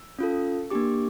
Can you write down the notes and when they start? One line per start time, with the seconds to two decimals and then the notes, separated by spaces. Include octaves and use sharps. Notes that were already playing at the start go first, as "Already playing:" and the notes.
Already playing: E6
0.19 C#4 F4 A4
0.70 A#3 D4 G4 D6